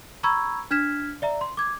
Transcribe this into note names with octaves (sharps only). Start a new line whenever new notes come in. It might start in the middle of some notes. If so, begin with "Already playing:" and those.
A#5 B5 C#6 E6 G#6
D4 F6 G#6 B6 E7
D5 E5 A#5
C6
D6 G#6